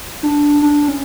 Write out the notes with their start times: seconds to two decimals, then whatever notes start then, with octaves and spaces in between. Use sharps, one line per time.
0.23 D4
0.62 D4
0.88 C#4